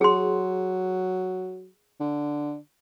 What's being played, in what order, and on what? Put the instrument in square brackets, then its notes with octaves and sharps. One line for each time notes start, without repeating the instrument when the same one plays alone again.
[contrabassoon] F#3 [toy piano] G#4 C6
[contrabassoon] D3